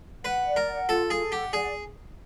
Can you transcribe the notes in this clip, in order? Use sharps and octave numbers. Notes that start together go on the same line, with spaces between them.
B4 F#5
D5
A#4
F#5
F4 A4
G#4 A4
G4 F#5
G#4 D5